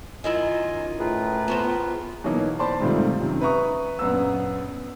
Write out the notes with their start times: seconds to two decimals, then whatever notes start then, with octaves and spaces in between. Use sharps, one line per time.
0.24 F#2 D#3 E4 F4 D#5 G#5
0.99 A2 F4 G#4 A#4 B4
1.48 B3 F#4 C5
2.24 B2 E3 F#3 A#3 D#4
2.59 C5 D5 A5 B5 C6
2.81 G#2 C3 D#3 F3 G3 A3
3.20 F#2 C3 D#3
3.41 B4 E5 A#5 C#6 D#6
3.99 A#1 F#2 B3 A#5 E6